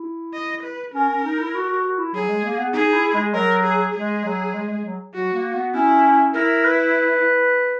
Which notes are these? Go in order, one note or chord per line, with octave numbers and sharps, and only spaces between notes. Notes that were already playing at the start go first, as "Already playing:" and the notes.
Already playing: E4
D#5
B4
C#4 A#4
C#4
D#4
E4
F#4
F#4
F#4
E4
F#3 G#4
G#3
A#3
B3
D#4 G#4
E4
G#3
F#3 A#4
G#4
G#3 G#4
F#3
G#3
G#3
F#3
F#3 F#4
A#3
B3
C#4 E4
E4 A#4
B4